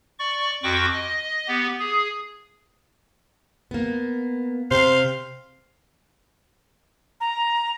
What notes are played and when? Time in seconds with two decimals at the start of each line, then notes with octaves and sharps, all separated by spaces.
0.19 D5 C#6
0.63 F2 F#4 G5 C#6 D6
0.93 D#5
1.48 B3 G4
1.79 G#4
3.71 A#3 B3
4.71 C3 C5 F5
7.20 A#5